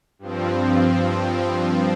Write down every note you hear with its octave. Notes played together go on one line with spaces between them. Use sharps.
G2 F3 C4